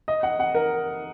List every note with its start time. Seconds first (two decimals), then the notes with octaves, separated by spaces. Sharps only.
0.08 D#5
0.23 F#5
0.40 F#5
0.55 A#4